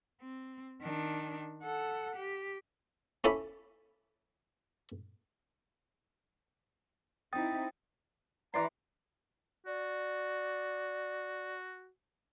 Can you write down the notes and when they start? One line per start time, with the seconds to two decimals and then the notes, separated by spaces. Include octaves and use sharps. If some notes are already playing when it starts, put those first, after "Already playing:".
0.21 C4
0.81 D#3 D4
1.63 A4 F#5
2.16 G4
3.24 C#4 E4 A4 D5 E5 B5
7.33 C4 D#4 E4 G5 D#6 A6
8.54 E3 D5 A#5 C6
9.67 F#4 D5